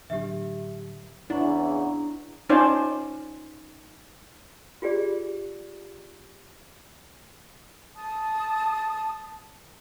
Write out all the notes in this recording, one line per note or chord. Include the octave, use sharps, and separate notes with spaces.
A2 D3 F#3 G4 E5
E2 C#3 D4 E4 F#5 A#5 C#6
C#4 D#4 F4 C5 D5 A5
F4 G4 G#4 D5
A5 D#6